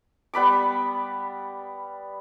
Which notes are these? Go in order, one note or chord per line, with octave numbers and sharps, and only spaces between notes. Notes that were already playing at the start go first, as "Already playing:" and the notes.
G3 B3 B5 D6